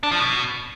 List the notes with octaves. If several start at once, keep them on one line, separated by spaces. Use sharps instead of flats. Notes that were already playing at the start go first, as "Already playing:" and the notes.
D4
F3
B2